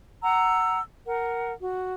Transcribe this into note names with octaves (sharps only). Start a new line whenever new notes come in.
F#5 A#5 E6
A#4 F#5
F#4